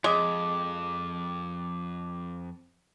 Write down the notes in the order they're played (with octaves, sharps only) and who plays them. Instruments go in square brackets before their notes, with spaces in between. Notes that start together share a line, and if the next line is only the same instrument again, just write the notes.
[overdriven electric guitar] F2 [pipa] G#3 [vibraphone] D6